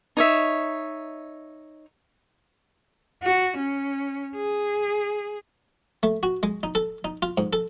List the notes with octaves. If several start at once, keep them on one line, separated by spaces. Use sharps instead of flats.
D#4 C#5 E5
F#4
C#4
G#4
A3
F#4
G#3
D#4
A4
D#4
F4
G#2
A4